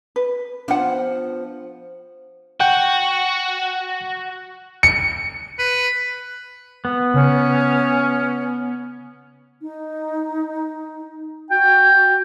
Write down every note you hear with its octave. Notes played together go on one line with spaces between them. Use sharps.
B4
F3 B3 D4 F4 F#5
F#4 F#5 G5
C#7
B4
B3
C#3 C#4
D#4
F#4 G5